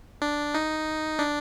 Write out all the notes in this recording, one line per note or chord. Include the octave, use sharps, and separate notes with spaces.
D4
D#4
D4